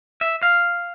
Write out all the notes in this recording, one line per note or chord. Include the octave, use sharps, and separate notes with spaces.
E5
F5